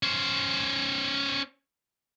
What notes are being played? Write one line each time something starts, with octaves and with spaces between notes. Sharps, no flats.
C#4 C5